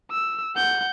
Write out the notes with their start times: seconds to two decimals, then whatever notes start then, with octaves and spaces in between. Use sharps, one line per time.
0.11 E6
0.56 F#5 G6